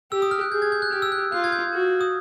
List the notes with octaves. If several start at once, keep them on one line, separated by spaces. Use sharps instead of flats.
G4 E6
D#6
F6
F#6
G#4 G6
G#6
G6
F#6
G4 F6
E6
F#6
F4 F#6
G#6
G6
F#4
D#6